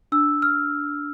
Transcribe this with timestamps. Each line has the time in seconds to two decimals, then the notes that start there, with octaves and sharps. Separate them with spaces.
0.12 D4 E6
0.42 F6